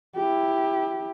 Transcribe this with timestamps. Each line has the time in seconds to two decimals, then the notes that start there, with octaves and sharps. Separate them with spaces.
0.16 E4 G4